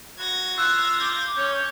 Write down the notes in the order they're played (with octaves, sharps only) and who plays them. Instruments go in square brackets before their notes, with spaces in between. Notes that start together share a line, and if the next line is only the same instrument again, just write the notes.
[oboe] F#4 [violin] G#6 A#6
[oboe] F4 [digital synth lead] E6 [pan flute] F#6
[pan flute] D6 [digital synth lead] G6
[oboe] C#4 [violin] C#5 [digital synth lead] G6